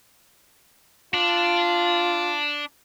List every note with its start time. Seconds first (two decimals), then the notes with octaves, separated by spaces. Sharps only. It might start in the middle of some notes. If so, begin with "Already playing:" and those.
1.14 D4 F4